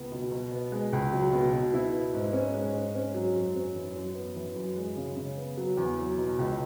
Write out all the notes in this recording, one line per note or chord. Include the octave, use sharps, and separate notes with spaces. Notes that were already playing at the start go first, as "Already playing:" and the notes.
Already playing: C#2 B3
B2
B2
B3
G#3
C#2
F#3
B2
B2
E4
B3
G#2
C#4
G#3
G#2
C#4
F#3
F#2
C#4
E3
F#2
B3
E3
F#2
G#3
C#3
C#3
B3
F#3
E2
F#3
B2
C#2